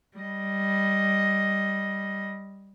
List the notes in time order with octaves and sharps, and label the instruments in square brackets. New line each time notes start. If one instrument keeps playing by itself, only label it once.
[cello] G3 D#5